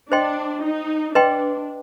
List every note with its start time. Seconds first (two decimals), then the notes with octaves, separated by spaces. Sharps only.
0.11 D4 C5 D#5 G5 C6
0.64 D#4
1.15 D4 B4 D#5 G5 C6